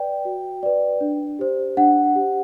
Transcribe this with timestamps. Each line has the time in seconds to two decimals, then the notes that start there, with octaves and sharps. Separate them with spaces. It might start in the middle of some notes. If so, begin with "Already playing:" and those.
Already playing: B4 D5 G5
0.25 F#4
0.63 B4 D5
1.01 D4
1.39 G4 C5
1.77 D4 F#5
2.16 G4 C5